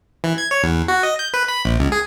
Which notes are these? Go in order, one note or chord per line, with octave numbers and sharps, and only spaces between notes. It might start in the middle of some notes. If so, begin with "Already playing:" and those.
E3
G#6
C#5
E2
F#4
D#5
G6
B4
B5
A#1
C#2
G#4